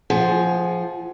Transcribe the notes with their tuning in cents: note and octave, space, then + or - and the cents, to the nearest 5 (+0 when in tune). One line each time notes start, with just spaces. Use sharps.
F3 +0 G#4 +15 F#5 +20